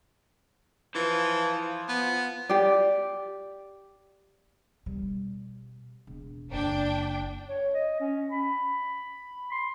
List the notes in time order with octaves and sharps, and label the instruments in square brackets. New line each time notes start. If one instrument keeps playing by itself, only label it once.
[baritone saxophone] E3 [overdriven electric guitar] F3
[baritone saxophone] B3
[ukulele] G4 D5
[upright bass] B2 G3
E1
[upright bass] F#1 E4 [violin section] D4 G5
[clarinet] C#5
D#5
C#4
B5
C6